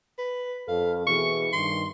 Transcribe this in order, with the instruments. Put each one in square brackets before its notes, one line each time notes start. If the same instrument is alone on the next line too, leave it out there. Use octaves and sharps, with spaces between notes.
[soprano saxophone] B4
[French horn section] F2 A4 [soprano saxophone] F5
[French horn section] B2 E3 G#4 [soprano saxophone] C#6
[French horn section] G2 D#3 [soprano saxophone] C6